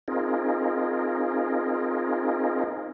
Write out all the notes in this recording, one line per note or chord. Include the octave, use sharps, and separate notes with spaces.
C4 D#4 F4 G#4 A#4